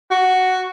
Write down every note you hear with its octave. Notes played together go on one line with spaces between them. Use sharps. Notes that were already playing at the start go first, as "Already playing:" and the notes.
F#4